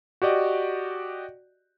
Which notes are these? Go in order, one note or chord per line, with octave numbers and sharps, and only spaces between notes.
F#4 G4 D5 D#5